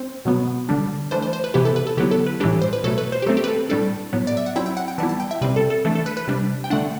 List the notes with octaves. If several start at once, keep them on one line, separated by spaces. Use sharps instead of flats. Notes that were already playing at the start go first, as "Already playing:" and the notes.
Already playing: C4 C5
B2 F#3 B3
D3 G3 D4
E3 A3 D4 C5
C5
C5
B4
C3 E3 B3 E4 G4
A4
B4
A4
D3 F#3 B3 E4 G4
A4
B4
A2 E3 G3 D4 G4
C5
B4
B2 F#3 A3 A4
B4
C5
G4
F#3 A3 C4 A4
G4
B4
A4
A2 G3 D4 A4
A2 F#3 B3
D5
E5
F#5
F#3 C4 E4 G5
G5
F#5
G5
E3 G3 B3 E4 A5
A5
G5
E5
C3 G3 C4 B4
A4
A4
E3 A3 D4 A4
A4
B4
B4
C3 G3 D4
G5
D3 A3 D4 F#5